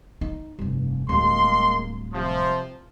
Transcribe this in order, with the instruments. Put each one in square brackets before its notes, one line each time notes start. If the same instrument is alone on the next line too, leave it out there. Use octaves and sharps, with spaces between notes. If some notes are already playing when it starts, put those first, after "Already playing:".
[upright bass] D#4
F1 G2
[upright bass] D1 G3 [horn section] G#3 A#3 C6
[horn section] C3 F3